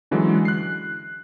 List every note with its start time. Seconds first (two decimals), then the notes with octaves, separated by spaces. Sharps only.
0.11 D3 E3 F#3 G#3 C#4
0.45 F#6 C7